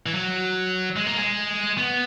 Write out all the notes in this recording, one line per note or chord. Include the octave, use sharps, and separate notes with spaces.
E3
F#3
G#3
A#3
G#3
B3